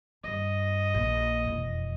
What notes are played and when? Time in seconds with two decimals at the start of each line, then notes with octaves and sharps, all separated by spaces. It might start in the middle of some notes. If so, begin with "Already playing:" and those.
0.24 G2 D#5
0.94 A#1
1.45 E1 F2